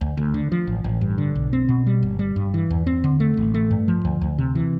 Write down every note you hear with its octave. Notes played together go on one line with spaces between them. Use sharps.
D2
D2
D3
F3
A1
A1
G2
D3
B1
C4
B2
G3
G1
G3
G2
E3
E2
C4
D3
A3
A1
A3
G2
F3
D2
D2
C3
E3